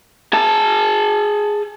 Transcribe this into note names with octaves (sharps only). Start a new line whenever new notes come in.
G#4 A5